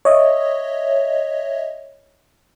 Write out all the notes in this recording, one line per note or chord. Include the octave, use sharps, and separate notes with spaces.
C#5 D#5 E5